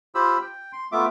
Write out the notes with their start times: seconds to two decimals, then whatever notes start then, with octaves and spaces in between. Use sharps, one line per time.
0.15 F4 G4 C5 B5 E6
0.42 G5
0.73 C6
0.92 A3 B3 F4 E5 D6